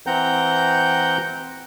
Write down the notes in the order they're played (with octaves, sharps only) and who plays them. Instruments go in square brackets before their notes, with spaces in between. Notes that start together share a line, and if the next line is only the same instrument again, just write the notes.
[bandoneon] E3 C4 F#5 G5 A#5 G6